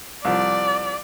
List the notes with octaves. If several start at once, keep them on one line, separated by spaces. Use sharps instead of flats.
C2 F3 D5